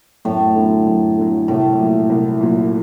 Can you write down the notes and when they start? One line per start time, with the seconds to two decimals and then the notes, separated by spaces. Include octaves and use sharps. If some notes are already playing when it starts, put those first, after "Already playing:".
0.25 F#2 A2
0.55 D3 F#3
0.86 F#2
1.17 D3 F#3
1.48 C2 A2
1.78 A#2 F#3
2.10 C2
2.40 A#2 F#3